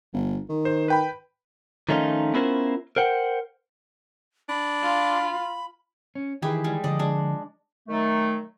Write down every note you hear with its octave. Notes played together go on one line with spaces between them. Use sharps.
G1
D#3
C5
B4 G5 B5
D#3 F3 A3 C#4 D#4 F4
B3 C#4 E4 F4 A#4 C5
A#4 C5 F#5 G5
D4 B5
F4
C#4
D#3 E3 E4 G4 G#4 B4
G3 G#3
D3 F3 D5 D#5
G#3 D4
D#3 F#3 A3